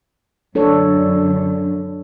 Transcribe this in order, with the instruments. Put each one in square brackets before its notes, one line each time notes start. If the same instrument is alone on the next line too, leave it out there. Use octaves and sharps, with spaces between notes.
[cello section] F#2 D3 [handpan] D4 A4 C#5